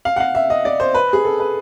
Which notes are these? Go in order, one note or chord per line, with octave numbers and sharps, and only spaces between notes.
F5
F#5
F5
E5
D#5
D5
C5
B4
G#4
A4
B4